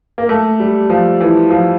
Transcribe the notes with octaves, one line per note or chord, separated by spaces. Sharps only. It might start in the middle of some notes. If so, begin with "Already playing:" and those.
A#3
A3
G3
F3
E3
F3